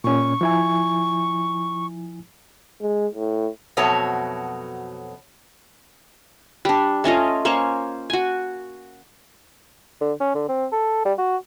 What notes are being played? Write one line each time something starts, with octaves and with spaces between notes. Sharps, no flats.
A#2 C#4 C#6
F3 E4 G#5
G#3
A2
F2 B2 F#3 A3 C#5 A5
G3 D4
A3 C#4 F4 D#5
A#3 C#4 C5 C#6
F#4 G#5
D3
C#4
D3
C4
A4
G3
F#4